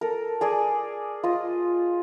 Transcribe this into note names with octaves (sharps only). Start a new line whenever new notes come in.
A4 A#4
G#4 D5 G#5
F4 D#5